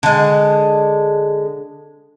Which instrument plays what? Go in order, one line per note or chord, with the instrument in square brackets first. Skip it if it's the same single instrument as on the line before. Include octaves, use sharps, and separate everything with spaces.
[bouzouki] D3 G#3